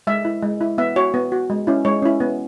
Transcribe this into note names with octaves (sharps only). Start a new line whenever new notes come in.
G#3 E5
E4
G#3
E4
B3 E5
F#4 C#5
B3
F#4
G#3
C#4 E4
G#3 C#5
C#4 E4
B3